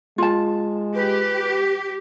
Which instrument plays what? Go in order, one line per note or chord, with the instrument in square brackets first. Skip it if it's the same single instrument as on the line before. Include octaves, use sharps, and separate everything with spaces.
[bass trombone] G#3 [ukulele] F4 A5
[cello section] G4 [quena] B4